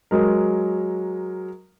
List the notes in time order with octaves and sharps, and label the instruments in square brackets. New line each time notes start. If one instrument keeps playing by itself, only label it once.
[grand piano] F#3 G#3 A#4